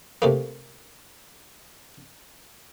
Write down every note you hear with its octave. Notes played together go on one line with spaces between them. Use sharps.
C3 A3 A#3